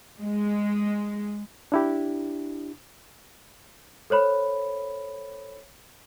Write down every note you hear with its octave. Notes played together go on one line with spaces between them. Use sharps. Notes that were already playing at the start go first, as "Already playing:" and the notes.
G#3
D4 E4 G4
A4 C5 C#5 B5